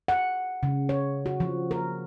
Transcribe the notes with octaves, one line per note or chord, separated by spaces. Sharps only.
F#5
C#3
C#5
F#4
F3
A#4